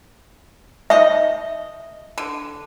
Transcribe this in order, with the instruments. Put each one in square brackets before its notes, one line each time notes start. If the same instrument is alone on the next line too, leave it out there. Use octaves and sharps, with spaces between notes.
[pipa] D#4 D#5 [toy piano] E5
[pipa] D3